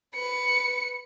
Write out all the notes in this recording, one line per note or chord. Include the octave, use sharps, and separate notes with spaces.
B4 C#7